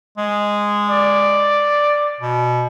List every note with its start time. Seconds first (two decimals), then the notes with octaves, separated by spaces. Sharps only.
0.18 G#3
0.89 D5
2.21 B2